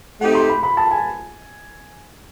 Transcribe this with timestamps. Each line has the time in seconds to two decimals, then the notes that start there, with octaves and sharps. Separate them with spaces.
0.20 A3 C4 D#4 G4 F#5
0.35 C6
0.50 B5
0.63 B5
0.77 A5
0.91 G#5